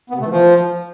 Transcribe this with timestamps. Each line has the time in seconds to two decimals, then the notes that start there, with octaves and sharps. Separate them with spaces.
0.10 B3
0.15 C3
0.20 A3
0.25 E3
0.30 F3